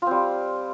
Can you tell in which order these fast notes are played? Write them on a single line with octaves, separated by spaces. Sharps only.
F4 C4 G3